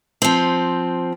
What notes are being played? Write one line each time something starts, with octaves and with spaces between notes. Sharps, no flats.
F3 C4